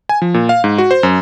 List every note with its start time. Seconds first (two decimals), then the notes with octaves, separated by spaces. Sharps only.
0.09 G#5
0.22 F3
0.34 A#2
0.49 F5
0.64 G#2
0.78 F#4
0.91 C5
1.03 F#2